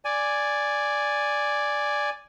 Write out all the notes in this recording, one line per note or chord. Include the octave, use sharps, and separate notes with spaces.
D5 G#5